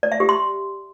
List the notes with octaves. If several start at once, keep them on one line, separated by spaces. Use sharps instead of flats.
D5
E5
G4
C6